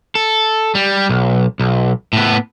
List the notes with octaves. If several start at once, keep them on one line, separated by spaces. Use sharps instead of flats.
A4
G3
B1
B1
A2 B3